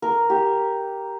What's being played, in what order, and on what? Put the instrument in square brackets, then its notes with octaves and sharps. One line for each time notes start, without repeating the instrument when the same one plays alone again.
[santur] A#4
G4